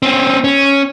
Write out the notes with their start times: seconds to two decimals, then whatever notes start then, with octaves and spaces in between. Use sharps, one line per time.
0.03 C4 C#4
0.44 C#4